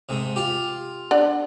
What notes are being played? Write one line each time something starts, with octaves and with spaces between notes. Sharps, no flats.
G#2 C3
F4 G4
D4 F#5